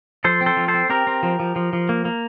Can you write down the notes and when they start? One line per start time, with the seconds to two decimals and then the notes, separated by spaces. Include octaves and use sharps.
0.24 F3 A4 C5
0.41 C4
0.46 A4 C5
0.57 F3
0.68 A4 C5
0.74 C4
0.90 C4 G4 A#4
1.07 C4
1.23 F3
1.40 F3
1.56 F3
1.73 F3
1.89 A#3
2.05 A#3